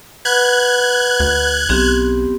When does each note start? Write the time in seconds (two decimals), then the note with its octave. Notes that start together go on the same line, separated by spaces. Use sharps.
0.25 B4 F#5 B5 F#6 G#6
1.20 D2
1.69 B1 B3 C4 G4